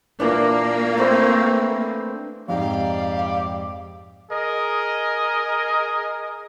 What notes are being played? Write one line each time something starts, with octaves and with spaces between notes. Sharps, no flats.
A#2 E3 A#3 D4
A3 C4 B4
F2 G#2 G4 D5 F5 A#5
G#4 A#4 D#5